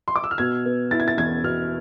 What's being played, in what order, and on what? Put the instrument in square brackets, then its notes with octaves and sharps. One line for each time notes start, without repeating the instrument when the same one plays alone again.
[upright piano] C6
D6
E6
F6
B2 G#6
B3
E4 A6
G#6
A6
E2 G#6
B2 F6